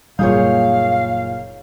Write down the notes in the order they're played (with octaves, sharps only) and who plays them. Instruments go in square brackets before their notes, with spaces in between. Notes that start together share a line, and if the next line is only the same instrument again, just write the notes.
[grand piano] F#1 A#2 G6 [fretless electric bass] G3 [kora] D#4 G#4 C#5 [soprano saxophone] F5